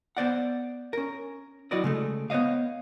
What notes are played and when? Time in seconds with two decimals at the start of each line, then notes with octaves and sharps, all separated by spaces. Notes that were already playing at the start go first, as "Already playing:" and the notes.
0.17 B3 C5 D5 F#5
0.93 C#4 A#4
1.71 F#3 E4 F#4 B4 D5 D#5
1.84 C#3 G#3 A3
2.30 B3 C5 C#5 D#5 F5